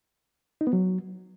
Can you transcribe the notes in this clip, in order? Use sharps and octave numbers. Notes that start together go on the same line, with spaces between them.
D#4
B3
F#3